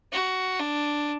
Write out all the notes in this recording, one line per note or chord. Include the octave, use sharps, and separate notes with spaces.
F#4
D4